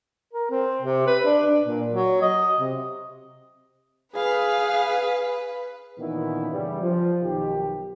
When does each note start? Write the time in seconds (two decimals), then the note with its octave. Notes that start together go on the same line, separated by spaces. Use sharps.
0.33 A#4
0.51 C4
0.82 C3
1.07 B4
1.24 D4
1.46 D4
1.64 A#2
1.89 F#3
2.22 D#5
2.60 C3
4.15 G#4 B4 F5
5.99 A#2 D#3 E3 B3 C#4 E4
6.52 G2 C#3 E3 G3
6.82 F3
7.22 B1 D#3 G4